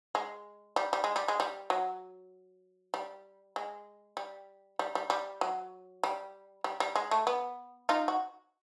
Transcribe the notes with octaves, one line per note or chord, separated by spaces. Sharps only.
G#3
G3
G3
G#3
G3
G#3
G3
F#3
G3
G#3
G3
G3
G3
G3
F#3
G3
G3
G3
G#3
A3
B3
D#4 F4
F#4